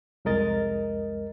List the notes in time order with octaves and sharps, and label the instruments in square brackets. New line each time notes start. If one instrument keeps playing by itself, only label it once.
[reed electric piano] C2 F2 G#3 A#4 D#5 A6